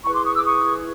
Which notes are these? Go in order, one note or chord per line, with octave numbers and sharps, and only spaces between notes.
E4 G#4 B4 B5 C#6
C6 D6
C#6 D#6
D6 E6
C#6 D#6